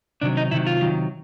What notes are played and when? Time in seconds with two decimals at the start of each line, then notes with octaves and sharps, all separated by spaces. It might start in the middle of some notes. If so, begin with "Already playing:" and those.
0.22 C3 D#3 F#3 D4
0.37 D#4
0.51 C3 D#3 F#3 E4
0.67 F4
0.81 C3 D#3 F#3